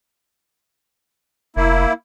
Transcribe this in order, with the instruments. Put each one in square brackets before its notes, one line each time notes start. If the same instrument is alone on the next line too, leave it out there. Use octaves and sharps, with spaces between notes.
[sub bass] F1 [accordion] A#3 E4